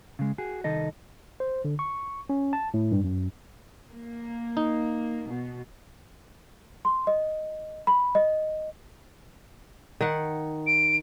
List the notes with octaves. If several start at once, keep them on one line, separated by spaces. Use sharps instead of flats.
C#3 G#3
F#4 G#4
C2 D#3 A4 D#5
C5
D3
C#6
C#4
A5
A2
G2
F#2
A#3
D#4
B2
C6
D#5
B5
D#5
D#3 F#5
D7